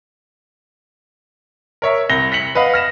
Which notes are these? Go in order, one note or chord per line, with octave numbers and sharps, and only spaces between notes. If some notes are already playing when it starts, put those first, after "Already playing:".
A#4 C#5 E5
C2 A#6 G7
A#6 B6 C#7 F#7
B4 D#5 F5 F#5 B5
F6 A#6 E7